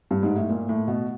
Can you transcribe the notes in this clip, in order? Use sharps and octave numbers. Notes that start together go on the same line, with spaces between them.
G2
G#2
A2
A#2
A2
B2